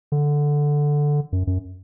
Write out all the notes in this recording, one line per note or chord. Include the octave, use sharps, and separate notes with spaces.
D3
F#2
F#2